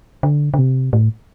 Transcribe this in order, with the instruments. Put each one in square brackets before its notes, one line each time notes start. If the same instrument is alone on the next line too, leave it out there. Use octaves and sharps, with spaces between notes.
[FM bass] D3
D3
C3
A2